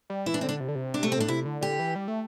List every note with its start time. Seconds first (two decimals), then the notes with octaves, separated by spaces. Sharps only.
0.10 G3
0.26 E3 E4
0.34 D4
0.41 D3 C4
0.49 D4
0.60 C3
0.68 D3
0.75 C3
0.94 D4
1.03 A3
1.12 C4
1.18 A2 D4
1.28 C3 E4
1.45 D3
1.61 D3 G4
1.79 E3
1.96 G3
2.08 A3